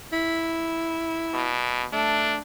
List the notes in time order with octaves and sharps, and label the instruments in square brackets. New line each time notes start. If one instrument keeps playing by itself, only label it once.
[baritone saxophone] E4
[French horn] B2
[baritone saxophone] A3 [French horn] D4